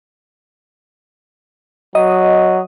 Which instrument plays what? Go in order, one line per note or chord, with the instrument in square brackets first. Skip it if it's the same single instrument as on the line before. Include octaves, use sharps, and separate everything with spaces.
[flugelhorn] F#3 [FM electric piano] D#5